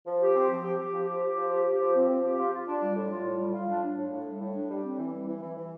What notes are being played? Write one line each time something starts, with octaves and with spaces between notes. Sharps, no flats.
F3
G4
C4
F3
G4
G4
F3
G4
G4
F3
G4
G4
F3
C4
F3
G4
F4
F4
D4
G3
A2
F4
A2
G3
F4
D4
D4
A2
A2
G3
A2
D4
G3
C4
E3
G3
E3
E3
E3